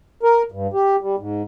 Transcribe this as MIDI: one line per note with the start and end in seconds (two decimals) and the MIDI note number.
0.23 0.42 70
0.52 0.67 43
0.74 0.96 67
1.01 1.16 55
1.19 1.42 44